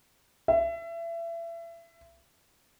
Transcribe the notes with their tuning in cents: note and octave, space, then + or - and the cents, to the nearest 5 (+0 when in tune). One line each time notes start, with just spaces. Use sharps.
E5 +30